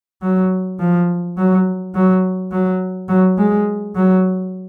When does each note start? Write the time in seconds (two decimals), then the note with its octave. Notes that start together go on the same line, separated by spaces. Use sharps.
0.22 F#3
0.80 F3
1.37 F#3
1.95 F#3
2.52 F#3
3.09 F#3
3.38 G#3
3.96 F#3